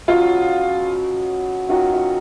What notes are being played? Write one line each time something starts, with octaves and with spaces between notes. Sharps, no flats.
B2 F#3 C#4 F4 G#4
D#3 F#3 C#4 F4 F#4
F4